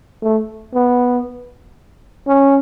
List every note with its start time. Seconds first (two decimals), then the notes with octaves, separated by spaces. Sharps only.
0.22 A3
0.74 B3
2.27 C#4